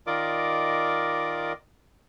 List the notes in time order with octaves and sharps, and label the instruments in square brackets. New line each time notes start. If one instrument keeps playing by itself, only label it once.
[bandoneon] D#3 F4 A#4 D5 D#5 D6